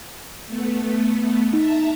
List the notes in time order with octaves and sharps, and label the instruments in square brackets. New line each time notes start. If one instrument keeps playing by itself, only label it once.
[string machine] A3 B3
[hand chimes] D#4 [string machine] E5 A5 A#5